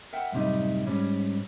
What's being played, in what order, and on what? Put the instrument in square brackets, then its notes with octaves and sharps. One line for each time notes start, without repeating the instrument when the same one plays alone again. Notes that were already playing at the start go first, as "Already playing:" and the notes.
[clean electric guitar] A#4 E5 F#5 G5
F#2 A2 C3 G3 D#4
G#2 G3 C#4